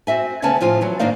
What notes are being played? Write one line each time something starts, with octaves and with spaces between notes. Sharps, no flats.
C4 F#4 E5 G#5
D2 C#3 B3 C#4 G#5 A5
A2 F3 F4 G#5
E3 F#3 F#4
G#2 D#3 A#3 D4 D#4 F5